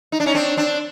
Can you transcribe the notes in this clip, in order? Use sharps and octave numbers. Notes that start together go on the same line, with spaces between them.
D#4
D4
C#4 D#4
C4 D4
C4 D4